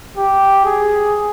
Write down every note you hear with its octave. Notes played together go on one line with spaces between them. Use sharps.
G4
G#4